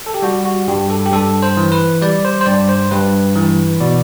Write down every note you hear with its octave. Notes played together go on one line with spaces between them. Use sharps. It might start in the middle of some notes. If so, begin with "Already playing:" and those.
A4
G4
G3 F#4
F#4
G2 G4
A4
G4
G2 A4
C5
E3
B4
G3 D5
C5
C5
G2 D5
C5
G2 B4
E3
B2 D5